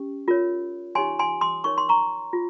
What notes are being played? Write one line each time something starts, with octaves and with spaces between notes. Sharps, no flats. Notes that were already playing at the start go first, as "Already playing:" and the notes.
Already playing: C#4 G4
F4 A#4 C#5
D#4 G4 C#5 G#5 C6
G#5 C6
C6 D#6
D#4 A#4 C#5 C#6
C6
A#5 C#6
F4